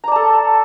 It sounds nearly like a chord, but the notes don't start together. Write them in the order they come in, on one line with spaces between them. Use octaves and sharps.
A#5 D5 A5 A4